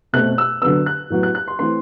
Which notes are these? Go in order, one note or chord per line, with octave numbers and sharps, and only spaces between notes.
B2 A3 C4 F#6
E6
D3 F#3 B3 E6
F#6
A2 F#3 B3
F#6
F#6
C6
E3 A3 C4 C6